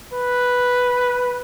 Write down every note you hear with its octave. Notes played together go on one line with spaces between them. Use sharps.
B4